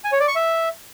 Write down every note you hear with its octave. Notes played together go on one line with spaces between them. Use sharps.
G#5
C#5
D5
C#6
E5